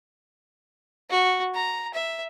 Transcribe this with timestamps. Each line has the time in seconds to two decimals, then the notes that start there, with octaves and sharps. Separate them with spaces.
1.10 F#4
1.55 A#5
1.94 E5